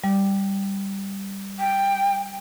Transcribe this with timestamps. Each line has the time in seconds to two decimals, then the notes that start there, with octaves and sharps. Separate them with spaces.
0.04 G3
1.59 G5